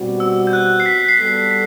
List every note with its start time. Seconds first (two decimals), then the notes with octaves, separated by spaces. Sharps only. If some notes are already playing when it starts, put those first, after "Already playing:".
Already playing: B2 G3 C4 F#4
0.20 E6
0.47 G6
0.53 F#6
0.80 C7
0.86 B6
1.08 C7
1.18 G3 B3 F#4 A4 B6
1.51 B6